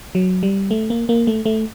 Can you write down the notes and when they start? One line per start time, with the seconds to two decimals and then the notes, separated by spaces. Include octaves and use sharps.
0.15 F#3
0.43 G3
0.71 A3
0.90 A#3
1.09 A#3
1.27 A3
1.46 A3